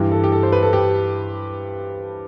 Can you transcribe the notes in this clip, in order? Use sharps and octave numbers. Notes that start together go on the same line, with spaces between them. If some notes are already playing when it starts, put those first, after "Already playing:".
Already playing: G2 E3 G4
A4
G4
A4
C5
B4
A4
G4